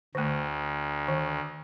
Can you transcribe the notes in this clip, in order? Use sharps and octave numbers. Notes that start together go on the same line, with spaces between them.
D2 D3 A3
D#3